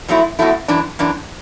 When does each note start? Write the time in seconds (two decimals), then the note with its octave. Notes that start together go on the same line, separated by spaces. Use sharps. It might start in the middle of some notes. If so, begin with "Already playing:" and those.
0.08 B2 F#3 A3 E4
0.39 B2 F#3 A3 E4
0.68 F#2 E3 D4
0.99 F#2 E3 D4